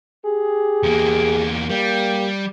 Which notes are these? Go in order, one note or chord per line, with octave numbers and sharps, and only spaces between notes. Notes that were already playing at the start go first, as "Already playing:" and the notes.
G4 G#4
E2 A#3
G3 A#3 G4